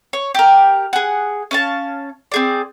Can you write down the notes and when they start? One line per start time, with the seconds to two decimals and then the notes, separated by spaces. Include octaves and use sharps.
0.13 C#5
0.35 G4 A#4
0.93 G#4 F#5
1.51 C#4 F5 A5
2.32 C4 G#4 D5